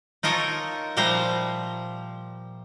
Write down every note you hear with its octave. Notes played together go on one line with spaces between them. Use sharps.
D#4 F4 A4 A#4 C#5
A#2 F3 G3 C5 E5 A#5